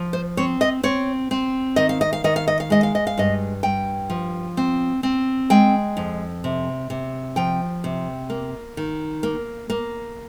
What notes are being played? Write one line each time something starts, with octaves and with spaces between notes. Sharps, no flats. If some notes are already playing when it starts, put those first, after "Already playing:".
Already playing: F3
C5
C4 C#5
D#5
C4 C#5
C4
D#3 D#5
F5
D#5
F5
D#3 D#5
F5
D#5
F5
G#3 D#5
F5
D#5
F5
G2 D#5
G2 G5
F3
C4
C4
G#3 G5
F2
C3
C3
F3 G5
C3
A#3
D#3
A#3
A#3